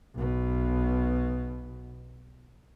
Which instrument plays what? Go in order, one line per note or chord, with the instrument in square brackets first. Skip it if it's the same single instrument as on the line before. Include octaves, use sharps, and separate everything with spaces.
[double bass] B1 B2